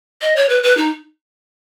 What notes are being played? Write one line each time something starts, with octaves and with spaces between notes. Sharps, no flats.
D#5
C#5
B4
B4
D#4